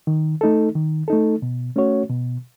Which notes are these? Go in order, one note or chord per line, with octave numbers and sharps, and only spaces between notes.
D#3
A3 D#4 A4
D#3
A3 D#4 A4
B2
A3 C#4 F#4 C#5
B2